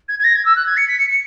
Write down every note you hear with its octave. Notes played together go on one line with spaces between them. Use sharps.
G#6
G#6
A#6
G#6
E6
F#6
G#6
C#7
B6
C#7
C#7